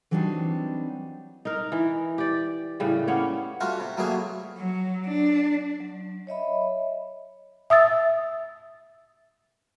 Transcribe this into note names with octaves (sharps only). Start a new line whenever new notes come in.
E3 F#3 G3 C4 D4 D#4
D#4 A#4
E3
G4 D5
A2 C#3 G3
A#3 B3 C#4 C#5
G3 A3 F4 F#4
C3
F#3 G3 A3 A#3 G#4
F#3
D4
F#3
C#5 D#5 E5 B5
E5 D#6 E6 A6